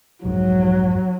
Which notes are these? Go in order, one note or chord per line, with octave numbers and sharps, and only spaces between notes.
B1 F2 G#2 F#3